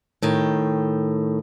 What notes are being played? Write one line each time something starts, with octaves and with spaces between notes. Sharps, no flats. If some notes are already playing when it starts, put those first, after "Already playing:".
A2 D#3 G5